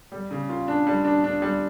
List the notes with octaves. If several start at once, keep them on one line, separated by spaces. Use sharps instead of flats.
G3
C#3
F4
D4
G3
D4
D4
G3